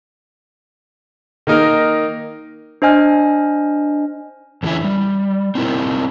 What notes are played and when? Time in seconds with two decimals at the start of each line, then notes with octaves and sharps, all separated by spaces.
1.47 D#3 A#3 D#4 A#4
2.82 D4 C5 D#5 G#5 F6
4.63 E2 D3 E3 C#4 E4 E5
4.84 G3
5.55 C4 D#4 E4 A#4